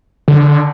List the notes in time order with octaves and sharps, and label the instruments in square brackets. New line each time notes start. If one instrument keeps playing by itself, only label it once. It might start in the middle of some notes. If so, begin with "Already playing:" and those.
[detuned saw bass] D3